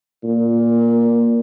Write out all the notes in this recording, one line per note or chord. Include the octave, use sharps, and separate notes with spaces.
A#2